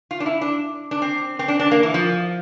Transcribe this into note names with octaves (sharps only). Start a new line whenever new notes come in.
F4
D4
E4
D4
D4
C4
C4
D4
D4
A#3
E3
F3